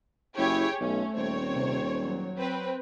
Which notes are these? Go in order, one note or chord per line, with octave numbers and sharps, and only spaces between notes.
F#1 E4 G4 G#4 C#5
B1 A3 C#4
D#1 C4 C#5
C3
F#3
C4 B4